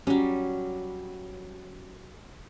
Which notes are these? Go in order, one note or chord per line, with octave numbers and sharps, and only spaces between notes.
F#3 G3 C#4